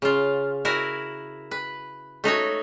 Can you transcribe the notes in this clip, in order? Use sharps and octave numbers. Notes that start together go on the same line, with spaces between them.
C#3 F4
E4 F#4 A#4 G#5
B4
A3 D#4 F#4 C#5